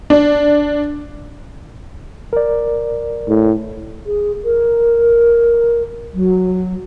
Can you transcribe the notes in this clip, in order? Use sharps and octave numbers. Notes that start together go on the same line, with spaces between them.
D4
A#4 D5
A2
G#4
A#4
F#3